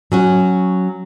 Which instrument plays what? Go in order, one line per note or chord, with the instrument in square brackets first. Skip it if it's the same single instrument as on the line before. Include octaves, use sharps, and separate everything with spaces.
[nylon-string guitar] F#3 C#4 F#4